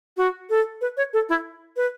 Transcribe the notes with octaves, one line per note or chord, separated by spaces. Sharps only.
F#4
A4
B4
C#5
A4
E4
B4